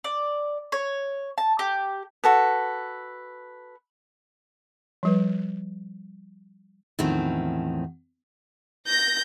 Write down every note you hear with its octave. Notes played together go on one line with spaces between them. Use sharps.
D5
C#5
A5
G4
F#4 A4 B4
F3 G3 B4
E2 A2 D#3 F3 C4 C#4
G6 A#6